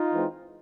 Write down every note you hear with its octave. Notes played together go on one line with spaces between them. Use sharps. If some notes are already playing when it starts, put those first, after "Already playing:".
Already playing: D#4 F4
E3 G#3 C4